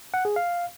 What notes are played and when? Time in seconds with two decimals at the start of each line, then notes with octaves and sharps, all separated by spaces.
0.14 F#5
0.25 G#4
0.36 F5